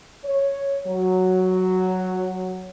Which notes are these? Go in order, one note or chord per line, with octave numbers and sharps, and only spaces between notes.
C#5
F#3